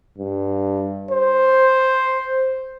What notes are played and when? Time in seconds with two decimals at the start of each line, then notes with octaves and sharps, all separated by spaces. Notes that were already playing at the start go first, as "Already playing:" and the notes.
0.18 G2
1.11 C5